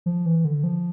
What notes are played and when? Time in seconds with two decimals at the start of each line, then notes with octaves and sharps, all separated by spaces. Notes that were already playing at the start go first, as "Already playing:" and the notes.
0.06 F3
0.26 E3
0.45 D3
0.64 F3